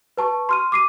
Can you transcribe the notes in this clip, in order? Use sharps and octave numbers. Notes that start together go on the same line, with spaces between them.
B4 A5 C#6
C6 F6 D#7
D6 C7 D#7